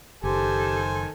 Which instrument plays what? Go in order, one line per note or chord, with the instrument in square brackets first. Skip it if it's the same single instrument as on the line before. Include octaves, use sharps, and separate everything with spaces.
[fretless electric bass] F#1 [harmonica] D#3 C5 G#5 [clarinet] G4 [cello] A4